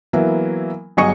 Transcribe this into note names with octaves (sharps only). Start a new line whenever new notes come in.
E3 F#3 A#3 B3 E4
G1 F#3 G#4 D#5 C#6 C#7